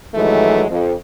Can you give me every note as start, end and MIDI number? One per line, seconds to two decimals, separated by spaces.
0.14 0.65 43
0.14 0.65 51
0.14 0.65 52
0.14 0.65 54
0.14 0.65 56
0.14 0.65 57
0.69 0.93 41